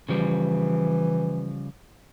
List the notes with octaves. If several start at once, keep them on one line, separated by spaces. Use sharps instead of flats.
C#3 E3 F3 G3